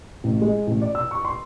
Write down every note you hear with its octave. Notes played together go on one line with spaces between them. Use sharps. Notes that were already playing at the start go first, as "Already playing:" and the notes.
A1
G#3
A1
D5
E6
C#6
C6